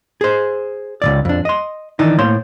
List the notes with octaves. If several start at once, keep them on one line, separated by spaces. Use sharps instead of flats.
G#4 C5
C#2 C3 D5
F2 D4
D#5 C6
D#3 E3 D4 D#4
A2 A#3 C5 C#5 C6